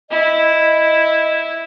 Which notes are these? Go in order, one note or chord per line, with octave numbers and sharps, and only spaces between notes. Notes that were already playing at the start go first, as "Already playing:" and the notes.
E4 D#5